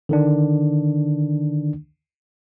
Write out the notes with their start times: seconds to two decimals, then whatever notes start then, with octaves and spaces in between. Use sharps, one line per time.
0.09 D3 D#3 D4